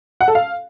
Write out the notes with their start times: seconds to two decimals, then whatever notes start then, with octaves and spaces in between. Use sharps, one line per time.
0.21 F#5
0.28 A4
0.35 F5